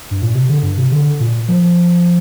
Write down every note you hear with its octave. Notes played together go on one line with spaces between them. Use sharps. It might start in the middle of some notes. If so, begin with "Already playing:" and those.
G2
A#2
C3
D3
G2
C3
D3
A#2
F3